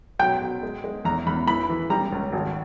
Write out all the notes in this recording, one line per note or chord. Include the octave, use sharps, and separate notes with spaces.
B1 G5
B1
G#3
G#3
E2 A#5
E2 B5
E3 B5
E3
G3 A#5
C#2
G#1